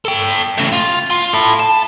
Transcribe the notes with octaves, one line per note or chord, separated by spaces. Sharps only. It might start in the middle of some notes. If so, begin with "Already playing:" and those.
A4 G5
A2 C#3
F4
F4
E4 A4
A5